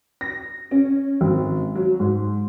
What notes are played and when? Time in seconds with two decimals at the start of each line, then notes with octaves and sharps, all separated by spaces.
0.21 A#6
0.71 C#4
1.21 G#1
1.75 F#3
2.00 G#2